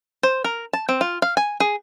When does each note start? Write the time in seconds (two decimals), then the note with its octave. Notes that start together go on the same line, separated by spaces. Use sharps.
0.23 C5
0.44 A#4
0.73 A5
0.89 C4
1.01 F4
1.22 F5
1.37 G#5
1.60 G#4